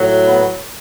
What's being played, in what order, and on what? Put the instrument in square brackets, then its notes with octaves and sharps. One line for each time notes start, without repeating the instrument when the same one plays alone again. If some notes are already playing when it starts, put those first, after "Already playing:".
Already playing: [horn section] A2 F#3
B3